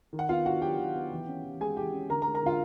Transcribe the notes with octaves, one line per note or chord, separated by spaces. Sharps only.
D#3
F#5
B3 F4 F5
D4 F#4 F#5
F#3 G4 G5
D#3
B3
E3
C#4
E3
G#3 G#4 G#5
E3 G4 G5
C#4
D3 A#4 A#5
A#4 A#5
G#3
A#4 A#5
D3 F4 F5